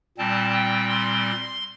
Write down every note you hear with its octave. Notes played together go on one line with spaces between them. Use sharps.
A#2 G3 C4 A5
G5
C6